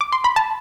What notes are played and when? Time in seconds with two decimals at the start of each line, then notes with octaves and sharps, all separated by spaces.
0.01 D6
0.12 C6
0.24 B5
0.36 A5